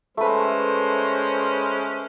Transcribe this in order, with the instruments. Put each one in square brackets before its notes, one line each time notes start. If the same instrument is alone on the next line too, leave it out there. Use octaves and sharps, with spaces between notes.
[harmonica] G#3 C#4 C5 [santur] A3 B4